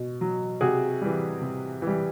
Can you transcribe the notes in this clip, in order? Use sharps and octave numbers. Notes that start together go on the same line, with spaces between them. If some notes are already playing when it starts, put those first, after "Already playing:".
Already playing: B2
F#3
C3 F#4 G#4
E3 G3
C3
E3 G3